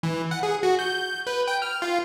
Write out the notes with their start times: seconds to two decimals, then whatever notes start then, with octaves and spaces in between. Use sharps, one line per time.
0.03 E3
0.31 F#5
0.43 G#4
0.63 F#4
0.79 G6
1.27 B4
1.48 G5
1.62 F6
1.82 F4